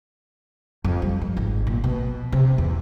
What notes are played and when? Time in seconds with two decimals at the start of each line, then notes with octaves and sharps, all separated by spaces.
0.84 F2
1.02 G3
1.22 G2
1.37 G#1
1.67 A#2
1.84 B2
2.32 C3
2.58 E2